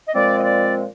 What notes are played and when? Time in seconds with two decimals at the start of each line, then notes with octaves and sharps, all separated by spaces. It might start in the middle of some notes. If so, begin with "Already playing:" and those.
0.08 D#5
0.14 A#2 F3 G#3 C4 D5
0.39 D#5
0.44 D5